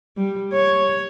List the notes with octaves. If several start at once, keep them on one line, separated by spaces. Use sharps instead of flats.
G3
C#5